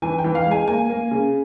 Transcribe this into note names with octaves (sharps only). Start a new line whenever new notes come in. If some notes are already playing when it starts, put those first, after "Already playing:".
E3 G#5
G5
E3
F5
G#3
G#5
A#3 G#5
A#3
C#3